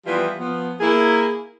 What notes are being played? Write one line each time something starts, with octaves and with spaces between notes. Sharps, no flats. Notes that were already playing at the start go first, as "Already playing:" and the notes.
E3 F3 G3 B3 F4 G4
F3 B3
A#3 E4 G#4